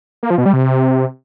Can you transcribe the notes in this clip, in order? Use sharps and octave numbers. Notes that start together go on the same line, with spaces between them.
A#3
F3
B2
G3
C3